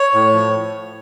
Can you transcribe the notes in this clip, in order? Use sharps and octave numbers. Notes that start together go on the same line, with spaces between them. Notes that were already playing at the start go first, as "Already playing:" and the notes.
Already playing: C#5
A2
F3